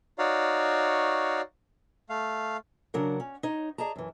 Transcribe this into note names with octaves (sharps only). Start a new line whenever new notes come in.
D#4 F#4 C#5 D5 F5
A3 F5
C#3 F#3 D4 A#4 F#5
C#4
D#4 C#5
G#4 D5 D#5 A5 A#5
F#2 E3